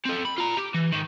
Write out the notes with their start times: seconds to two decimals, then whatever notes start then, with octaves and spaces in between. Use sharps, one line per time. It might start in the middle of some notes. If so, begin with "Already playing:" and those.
0.05 C4 A4
0.25 B5
0.38 F4 A#5
0.57 G4
0.74 E3
0.92 G#2 D#3